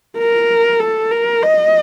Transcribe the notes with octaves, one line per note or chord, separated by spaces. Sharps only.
A#4
A4
A#4
D#5